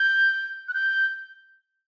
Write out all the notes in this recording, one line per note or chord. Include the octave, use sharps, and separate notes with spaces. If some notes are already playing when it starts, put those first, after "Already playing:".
Already playing: G6
F#6
G6